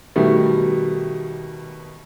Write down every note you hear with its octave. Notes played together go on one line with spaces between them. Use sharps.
B2 D#3 G3 A3 B3